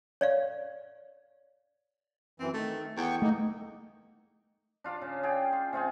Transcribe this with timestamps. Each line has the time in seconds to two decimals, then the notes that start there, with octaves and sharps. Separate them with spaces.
0.21 C#5 D5 F5
2.40 F#2 E3 C4
2.54 D#3 A3
2.97 E2 B3 G5 C#6
3.22 A3 A#3 D#4
4.84 D4 F4 F5 D6
5.02 C#3
5.23 G#4 D5 F5 G5
5.53 F4
5.73 C3 C4 F4 G#4